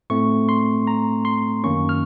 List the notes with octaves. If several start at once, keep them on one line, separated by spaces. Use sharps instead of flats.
A2 A3 C4 C#6
C6
A#5
C6
F#2 D#3 A#3 C#4 C#6
F6